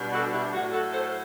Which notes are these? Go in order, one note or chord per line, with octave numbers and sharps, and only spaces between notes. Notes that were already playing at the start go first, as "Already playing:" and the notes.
Already playing: B2 G3 D4
F#4 A4
E4 G4
A2 F#3 A3 F#4
F#4 A4
A4 C5
A4